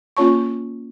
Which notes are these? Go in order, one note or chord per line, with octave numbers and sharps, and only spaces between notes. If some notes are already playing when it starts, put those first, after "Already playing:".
A#3 C#4 F4 C#5 A5 C#6